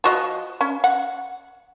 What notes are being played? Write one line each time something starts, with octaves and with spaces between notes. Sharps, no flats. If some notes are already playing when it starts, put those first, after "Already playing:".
F3 F#4 D#5
C#4
F#5